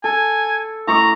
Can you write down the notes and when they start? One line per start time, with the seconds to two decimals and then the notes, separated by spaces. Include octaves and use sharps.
0.04 A4 G#5
0.87 A2 A#5 C#6 D6